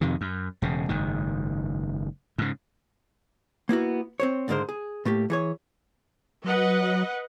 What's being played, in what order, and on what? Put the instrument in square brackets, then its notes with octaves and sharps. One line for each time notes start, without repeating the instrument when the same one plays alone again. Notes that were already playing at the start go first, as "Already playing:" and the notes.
[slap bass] F2 C3 D#3
F#2
E1 C#3
F#1 G#2 D#3
G#2 C#3
[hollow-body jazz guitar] A#3 B3 E4 F#4
C4 C5 C#5
C#2 G#2 D3 G#3 A#4 C5
G#4
A2 A3 A#3 G4
E3 G#4 C#5
[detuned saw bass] F#3 [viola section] B4 D#5 F#5